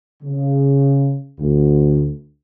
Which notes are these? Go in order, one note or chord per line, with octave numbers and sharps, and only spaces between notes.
C#3
D2